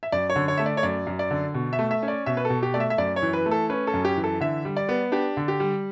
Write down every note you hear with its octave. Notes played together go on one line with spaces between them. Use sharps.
E5
F#2 D5
C#5
D3
C#5
A3 E5
D5
C#5
F#2 D5
F#2
D5
D3
B2
E5
A3
E5
C#4
D5
B2 E5
B4
A4
B2
G4
A3 D5
E5
E5
F#2 D5
C#5
E3
B4
A3
A4
C#4 B4
A4
F#2
G4
E3
A4
D3 E5
G3
D5
B3
D4 G4
D3
G4
G3